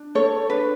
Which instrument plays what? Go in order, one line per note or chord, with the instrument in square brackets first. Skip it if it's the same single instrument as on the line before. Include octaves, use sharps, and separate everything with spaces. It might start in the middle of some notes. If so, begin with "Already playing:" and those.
Already playing: [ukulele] D4
A4 C#5
D4 B4